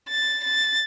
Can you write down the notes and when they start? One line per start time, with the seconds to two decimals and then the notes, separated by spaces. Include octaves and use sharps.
0.09 A6
0.44 A6